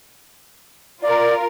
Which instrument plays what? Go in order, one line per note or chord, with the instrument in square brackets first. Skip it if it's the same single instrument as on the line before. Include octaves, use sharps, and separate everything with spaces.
[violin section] F4 A#4 [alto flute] D5